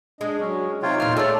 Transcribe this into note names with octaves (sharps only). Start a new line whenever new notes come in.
G#3 D4 D#5
F#3 C#4
C3 D#4 F4 C#5 G5
E2 A#2 F4 F6
A3 G#4 C#5 D5 E5